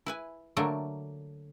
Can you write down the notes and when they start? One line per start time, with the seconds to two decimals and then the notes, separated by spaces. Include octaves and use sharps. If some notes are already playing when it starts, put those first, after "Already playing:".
0.06 E4 B4 G#5
0.57 D3 F#3 A3 A#3